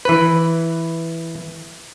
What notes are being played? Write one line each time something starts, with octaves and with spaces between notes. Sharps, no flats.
E3 B4